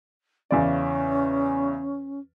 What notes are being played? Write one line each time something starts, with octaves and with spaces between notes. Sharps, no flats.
E2 C#3 C#4 D5